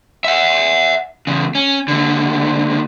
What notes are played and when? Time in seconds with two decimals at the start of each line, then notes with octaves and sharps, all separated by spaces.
0.24 E5 F#5
1.27 E2 C#3
1.55 C#4
1.88 D#2 D3